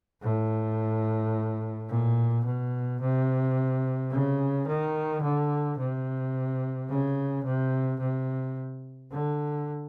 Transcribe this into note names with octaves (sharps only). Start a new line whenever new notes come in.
A2
A#2
B2
C3
C#3
D#3
D3
C3
C#3
C3
C3
D3